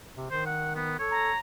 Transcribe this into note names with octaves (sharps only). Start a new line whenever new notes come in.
C3
D#3 C5
F#5
B3
A4 C#5
A#5